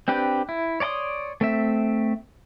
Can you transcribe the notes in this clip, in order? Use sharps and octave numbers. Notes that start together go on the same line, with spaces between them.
C4 D4 G4 B4
E4
C#5 D5 A5 C6 D#6
A3 C4 E5